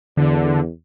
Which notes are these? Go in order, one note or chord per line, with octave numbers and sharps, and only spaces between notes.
E2 D3